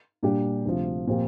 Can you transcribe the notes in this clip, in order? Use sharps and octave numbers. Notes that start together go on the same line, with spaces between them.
A#2 G3 D4 G4
D2 C3 F3
A#2 F3 C4 G4